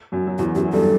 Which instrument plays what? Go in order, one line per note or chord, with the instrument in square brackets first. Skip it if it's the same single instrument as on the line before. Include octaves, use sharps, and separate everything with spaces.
[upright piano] F#2 F#3
F#3
[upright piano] E2 E3 [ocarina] F#4
[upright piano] F#2 F#3 [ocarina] G4
[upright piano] F#3
[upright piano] G2 G3 [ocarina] A4